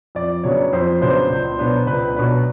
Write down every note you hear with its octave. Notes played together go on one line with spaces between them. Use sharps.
F2 D5
C#3 F#3 B3 D4 C#5
F2 C5
C#3 F#3 B3 D4 C5
C#2
B2 F#3 B3 D4
C#2 B4
B2 F#3 B3 D4 B4